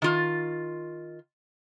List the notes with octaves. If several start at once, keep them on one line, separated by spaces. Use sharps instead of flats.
D#3 F4